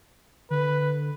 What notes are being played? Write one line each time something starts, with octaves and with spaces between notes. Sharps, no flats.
D3 B4